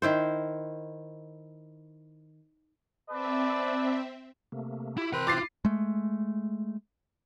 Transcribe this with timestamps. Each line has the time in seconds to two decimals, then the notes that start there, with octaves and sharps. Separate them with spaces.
0.02 D#3 E4 C5
3.10 C4 A4 B4 D5 E5
4.52 C3 A3 A#3
4.97 E4 F4 G4
5.13 C3 E3 C4 A#4 C5 B5 F#6
5.27 E4 F4 D6 A6 C7
5.65 G#3 A3